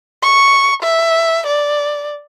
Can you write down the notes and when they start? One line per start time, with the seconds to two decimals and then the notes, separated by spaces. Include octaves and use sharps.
0.22 C#6
0.82 E5
1.47 D5